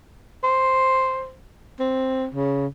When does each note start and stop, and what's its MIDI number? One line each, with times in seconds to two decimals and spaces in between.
0.44 1.33 72
1.79 2.27 60
2.34 2.67 49